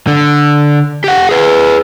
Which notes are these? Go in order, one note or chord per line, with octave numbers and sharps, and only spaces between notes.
D3
G4 F#5
G#4 B4